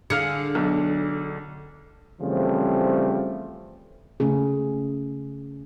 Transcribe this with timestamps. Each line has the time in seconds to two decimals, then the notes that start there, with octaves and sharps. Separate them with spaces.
0.10 D3 G#4 F5 F6 C#7
0.55 B1
2.21 C#3 E3 F3 G3 A3 C4
4.20 C#3 A3 C#4 G#4